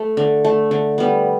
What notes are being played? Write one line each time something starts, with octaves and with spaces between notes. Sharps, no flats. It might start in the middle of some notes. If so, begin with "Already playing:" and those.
Already playing: A3
D3
A3
D3
G3 B3